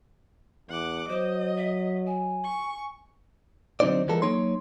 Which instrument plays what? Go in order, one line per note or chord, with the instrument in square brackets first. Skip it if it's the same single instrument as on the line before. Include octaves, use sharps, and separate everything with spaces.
[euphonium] E2 [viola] F#5 D6
[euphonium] F#3 [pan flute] C5 [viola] D#5
[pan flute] E5
G#5
[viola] C#6
[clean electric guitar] D3 F#3 C4 D#4 C5 D5
E3 F3 G#3 B3 A4 A#4
F#3 A#3 D#4 C#5 C6